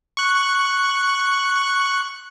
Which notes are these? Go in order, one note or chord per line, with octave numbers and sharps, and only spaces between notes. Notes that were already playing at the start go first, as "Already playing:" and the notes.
C#6 F#6